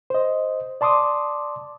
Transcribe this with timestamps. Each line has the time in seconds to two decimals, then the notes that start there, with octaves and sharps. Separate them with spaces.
0.10 C5 D#5
0.81 D5 A5 C6 D6 D#6